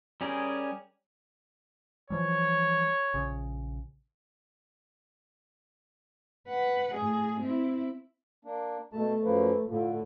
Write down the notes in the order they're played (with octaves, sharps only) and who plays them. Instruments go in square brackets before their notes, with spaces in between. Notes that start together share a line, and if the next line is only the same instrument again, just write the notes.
[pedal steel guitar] G3 C#4 G4 G#4 A#4
[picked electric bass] E3 F3 G3 [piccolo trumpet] C#5
[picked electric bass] A#1 C#3
[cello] B4 F#5
A2 G#4
C4 E4
[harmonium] A#3 D4
[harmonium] B2 A5 [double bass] A3
[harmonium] F#2 F3 A#3 [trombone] B4
[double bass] A2 [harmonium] D3 [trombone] F4